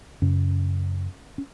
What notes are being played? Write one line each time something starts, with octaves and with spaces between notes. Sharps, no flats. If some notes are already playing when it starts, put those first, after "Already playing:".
F#2 C#3 C#4
C#4